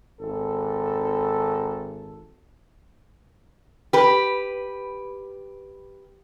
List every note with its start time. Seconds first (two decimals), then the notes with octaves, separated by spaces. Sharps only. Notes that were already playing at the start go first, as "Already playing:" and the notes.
0.19 G#1 A4
3.93 G4 B4